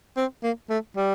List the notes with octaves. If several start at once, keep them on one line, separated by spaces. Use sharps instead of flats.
C4
A#3
A3
G3